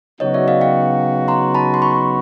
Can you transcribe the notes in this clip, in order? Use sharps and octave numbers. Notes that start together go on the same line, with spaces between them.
C#3 F#3 B3 D#4 F#4 C#5 D#5
D5 E5
D#5 F5
F5 G5
A#5 C6
A5 B5
C6
B5 C#6